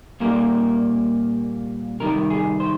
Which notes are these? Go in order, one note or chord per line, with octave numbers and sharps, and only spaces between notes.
A#2 G3 A#3 A#4
C3 D#3 G3 A#4
G#4
C5